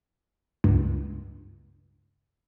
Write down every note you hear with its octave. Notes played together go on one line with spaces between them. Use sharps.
C#2 G2